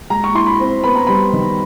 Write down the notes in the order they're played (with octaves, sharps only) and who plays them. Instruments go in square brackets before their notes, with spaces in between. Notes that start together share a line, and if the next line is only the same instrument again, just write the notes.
[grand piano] G#3 [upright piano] A#5
[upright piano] C#6
[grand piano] E4 [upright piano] C6
[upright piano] B5
[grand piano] C4
[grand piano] B3 [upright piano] B5
[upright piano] A#5
[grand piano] G3 [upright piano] B5
[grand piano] D#3